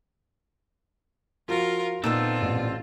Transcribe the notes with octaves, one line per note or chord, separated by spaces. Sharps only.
F3 F4 F#4 A#4
A#2 D3 B3 C4 D#4 F4 A4 E6
A1